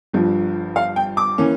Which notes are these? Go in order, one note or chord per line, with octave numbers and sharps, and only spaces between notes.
G1 G2 F3
F5
G5
D6
E3 A#3 C#4